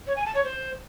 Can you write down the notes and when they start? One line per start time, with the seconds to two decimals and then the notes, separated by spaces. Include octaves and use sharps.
0.07 C#5
0.16 G#5
0.26 A5
0.35 C#5
0.44 C5